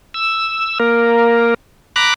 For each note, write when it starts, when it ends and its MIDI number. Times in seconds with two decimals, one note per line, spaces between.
0.14 0.78 88
0.80 1.54 58
0.80 1.54 70
1.96 2.14 82
1.96 2.14 83
1.96 2.14 86
1.96 2.14 90